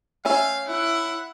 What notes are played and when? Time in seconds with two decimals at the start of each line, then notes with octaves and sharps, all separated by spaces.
0.25 A3 C#4 E5 F5
0.67 E4 F#5